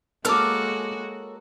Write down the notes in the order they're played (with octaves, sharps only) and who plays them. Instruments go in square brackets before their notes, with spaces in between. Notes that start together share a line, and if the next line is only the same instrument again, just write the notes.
[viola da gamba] G#3 A#3 F#4 [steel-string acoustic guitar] A4 A#4 C#5 [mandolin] D6 F6